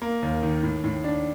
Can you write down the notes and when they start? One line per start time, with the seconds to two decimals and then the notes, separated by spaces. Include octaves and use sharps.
0.02 A#3
0.23 D#2
0.43 D#3
0.63 A2
0.84 A2
1.04 D4